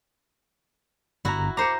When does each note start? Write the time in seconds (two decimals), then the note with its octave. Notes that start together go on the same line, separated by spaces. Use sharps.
1.25 G1 E4 F#4 A#5
1.57 C5 A#5 D6 C#7